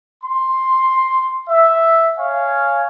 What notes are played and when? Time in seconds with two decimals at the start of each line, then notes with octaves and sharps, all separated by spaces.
0.24 C6
1.49 E5
2.18 C#5 F5 G#5